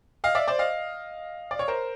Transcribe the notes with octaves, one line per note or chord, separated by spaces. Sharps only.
D#5 F5
D5 E5
C5 D5
D#5 F5
D5
C#5
A#4 C5